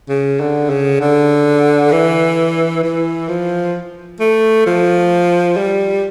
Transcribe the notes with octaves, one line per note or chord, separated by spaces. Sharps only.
C#3
D3
C#3
D3
E3
E3
F3
A3
F3
G3